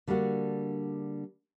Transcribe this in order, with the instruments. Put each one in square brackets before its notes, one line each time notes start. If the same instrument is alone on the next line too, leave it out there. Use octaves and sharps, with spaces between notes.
[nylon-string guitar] D3 G3 A#3 D4 F#4